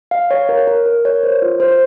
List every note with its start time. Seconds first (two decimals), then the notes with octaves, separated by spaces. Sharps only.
0.11 F5
0.31 C#5
0.49 A#4
0.68 A#4
0.86 A#4
1.05 C#5
1.23 C5
1.42 F4
1.60 C5